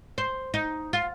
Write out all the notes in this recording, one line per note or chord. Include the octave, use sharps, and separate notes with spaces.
C5
D#4
F4